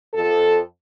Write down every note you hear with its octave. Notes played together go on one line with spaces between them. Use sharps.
F2 F3 A4